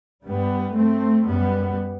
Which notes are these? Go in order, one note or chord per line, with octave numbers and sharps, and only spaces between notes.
G2 G3 B3
A3 C4
F#2 G3 B3